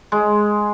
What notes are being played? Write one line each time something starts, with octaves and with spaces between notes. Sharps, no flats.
G#3